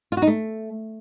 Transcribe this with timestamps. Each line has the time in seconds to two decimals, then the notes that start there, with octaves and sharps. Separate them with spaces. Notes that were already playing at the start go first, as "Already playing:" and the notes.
0.12 F4
0.17 F#4
0.22 D#4
0.27 A3